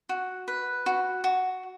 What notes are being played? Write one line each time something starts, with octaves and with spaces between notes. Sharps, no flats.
F#4
B4
F#4
F#4